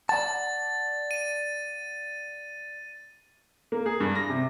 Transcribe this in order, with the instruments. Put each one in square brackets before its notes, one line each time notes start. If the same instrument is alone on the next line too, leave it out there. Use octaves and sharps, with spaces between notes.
[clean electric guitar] D5 F#5 A5 [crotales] A6
[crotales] D#7
[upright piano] A#3
G#4
G2
A#6
C3